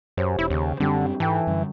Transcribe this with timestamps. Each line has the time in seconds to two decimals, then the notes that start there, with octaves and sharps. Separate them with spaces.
0.17 F#2 G4 C5 C#5
0.39 E1 E4
0.50 D#2 C#3
0.80 F#2 D3 G3 C4 D4 G4 G5
1.20 G#2 E3 A4 G5 A5
1.47 F#2 D3 G3